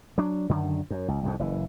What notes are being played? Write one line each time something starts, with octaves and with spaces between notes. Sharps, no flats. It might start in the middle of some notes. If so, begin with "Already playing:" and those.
F#3 D4
F#2 D3 D#3
F#2
C#2
C2 F2 G#2
F#1 E3